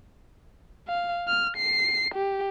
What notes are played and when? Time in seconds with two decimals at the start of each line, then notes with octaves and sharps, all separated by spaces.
0.88 F5
1.28 F6
1.57 C7
2.14 G4